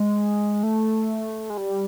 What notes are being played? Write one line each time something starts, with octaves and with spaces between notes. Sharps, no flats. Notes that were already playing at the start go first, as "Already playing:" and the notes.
Already playing: G#3
A3
G#3
G3